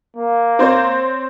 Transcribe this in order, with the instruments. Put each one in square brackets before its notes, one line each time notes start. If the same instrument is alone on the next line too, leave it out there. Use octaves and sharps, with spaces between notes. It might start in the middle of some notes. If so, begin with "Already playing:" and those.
[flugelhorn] A#3
[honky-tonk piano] C4 C5 C#5